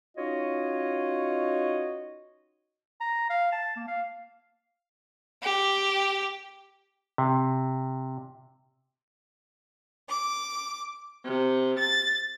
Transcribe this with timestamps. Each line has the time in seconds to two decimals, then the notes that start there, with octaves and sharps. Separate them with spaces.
0.17 C#4 D#4 F4 F#4 C#5 D#5
3.01 A#5
3.30 F5
3.52 A5
3.76 A#3
3.88 F5
5.43 G4
7.18 C3
10.09 D6
11.25 C3
11.77 A6